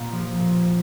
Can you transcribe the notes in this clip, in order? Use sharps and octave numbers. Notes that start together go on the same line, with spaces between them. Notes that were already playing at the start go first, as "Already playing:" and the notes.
Already playing: A#2 A#3
F3
A#2